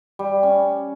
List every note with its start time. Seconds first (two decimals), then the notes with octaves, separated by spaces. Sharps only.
0.19 G3
0.43 C#4